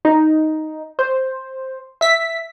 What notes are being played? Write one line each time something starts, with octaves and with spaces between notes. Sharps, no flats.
D#4
C5
E5 B6